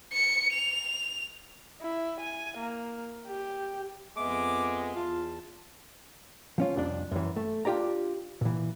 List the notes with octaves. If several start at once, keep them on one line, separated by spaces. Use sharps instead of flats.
C#7
F7
E4
G#5
A#3
G4
F2 G#3 B3 E5 D6
E2 F4 A5
F3 C#4 F4
C2 F2 D4
F#2 E3
A3
D4 F4 G4 D5 A#5
A#2 E3